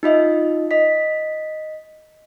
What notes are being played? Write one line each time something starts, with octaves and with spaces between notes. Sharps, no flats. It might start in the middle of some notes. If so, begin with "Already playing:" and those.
D#4 F4 D#5 E5
D#5 B6